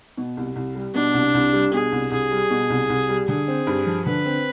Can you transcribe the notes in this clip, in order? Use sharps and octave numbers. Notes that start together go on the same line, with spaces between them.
B2
C2
C2
G3
B2 D4
C2
C2
G3
B2 G#4
C2
C2 G#4
G3
B2
C2
C2
G3
D3 G#4
C4
G2
F3
D3 B4
C4